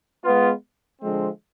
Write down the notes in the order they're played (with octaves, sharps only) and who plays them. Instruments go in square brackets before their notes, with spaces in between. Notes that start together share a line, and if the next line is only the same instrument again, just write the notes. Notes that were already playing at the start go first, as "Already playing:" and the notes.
[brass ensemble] G#3 B3 F4
D3 F3 G#3 C4